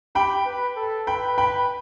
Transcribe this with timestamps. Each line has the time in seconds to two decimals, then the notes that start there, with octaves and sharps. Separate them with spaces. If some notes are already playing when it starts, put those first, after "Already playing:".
0.15 G4 G5 B5
0.46 B4
0.76 A4
1.07 B4 G5 B5
1.38 G5 B5